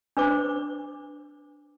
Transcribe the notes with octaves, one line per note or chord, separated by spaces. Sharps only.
D4 B4 C5 D6